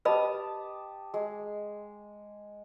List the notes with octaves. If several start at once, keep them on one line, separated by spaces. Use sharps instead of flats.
G4 B4 D#5 A5 B5 D#6
G#3